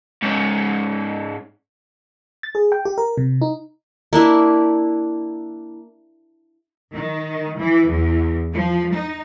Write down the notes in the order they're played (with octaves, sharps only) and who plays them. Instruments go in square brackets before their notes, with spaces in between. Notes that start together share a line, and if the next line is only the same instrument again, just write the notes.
[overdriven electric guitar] G#2 C#4
[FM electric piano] A6
G#4
G5
G4
A#4
C3
D#4
[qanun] A#3 D4 E4 G4
[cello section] D#3
E3
E2
F3
D#4